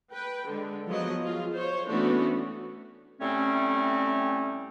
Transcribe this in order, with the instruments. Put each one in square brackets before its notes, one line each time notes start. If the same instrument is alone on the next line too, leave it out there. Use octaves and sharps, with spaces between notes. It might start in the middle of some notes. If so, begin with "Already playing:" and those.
[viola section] B4 G5
D3 G#3
F3 F#3 B3 D#5
F4 G#4
C5 C#5
E3 A3 B3 C#4 D4 F#4
[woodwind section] A2 G3 A3 C4 C#4